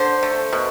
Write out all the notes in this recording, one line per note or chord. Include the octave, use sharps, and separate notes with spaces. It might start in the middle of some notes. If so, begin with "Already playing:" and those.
Already playing: D3 C5
A3
B2